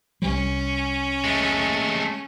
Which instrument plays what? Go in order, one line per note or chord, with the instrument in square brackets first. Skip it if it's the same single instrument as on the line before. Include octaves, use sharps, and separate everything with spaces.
[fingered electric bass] C2 G3 [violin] C#4
[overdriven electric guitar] G#3 A3